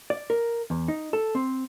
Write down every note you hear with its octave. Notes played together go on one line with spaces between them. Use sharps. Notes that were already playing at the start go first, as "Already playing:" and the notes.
D5
A#4
E2
D#4
A4
C4